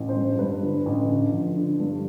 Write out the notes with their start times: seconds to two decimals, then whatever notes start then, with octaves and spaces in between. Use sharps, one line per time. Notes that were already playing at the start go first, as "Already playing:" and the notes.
Already playing: A1
0.09 C5
0.16 G2
0.39 G2 B4
0.62 D3
0.86 A1
1.10 D3
1.32 F3
1.57 D3
1.80 G2